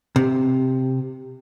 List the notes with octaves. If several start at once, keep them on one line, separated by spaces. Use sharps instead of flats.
C3